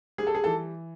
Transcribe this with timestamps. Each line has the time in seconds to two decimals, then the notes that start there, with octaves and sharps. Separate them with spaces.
0.18 G3 G#4
0.27 A4
0.35 G#4
0.44 E3 A4